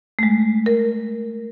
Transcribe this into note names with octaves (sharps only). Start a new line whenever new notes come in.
G#3 A3
A#4